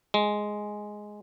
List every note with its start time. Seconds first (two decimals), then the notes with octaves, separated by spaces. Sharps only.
0.14 G#3